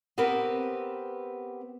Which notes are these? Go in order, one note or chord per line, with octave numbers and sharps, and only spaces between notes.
B3 C4 G4 A#4 B4